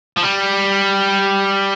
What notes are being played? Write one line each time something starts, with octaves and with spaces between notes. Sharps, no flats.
F3
G3